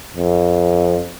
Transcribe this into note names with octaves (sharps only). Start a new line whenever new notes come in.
F2